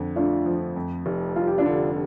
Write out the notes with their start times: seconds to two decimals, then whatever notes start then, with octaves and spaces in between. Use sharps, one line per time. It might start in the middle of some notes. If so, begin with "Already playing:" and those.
Already playing: F2 D3
0.16 A3 D4 F4
0.46 F3
0.76 F2
1.06 F1
1.36 G3 F4
1.47 G4
1.58 D4 F4
1.66 D3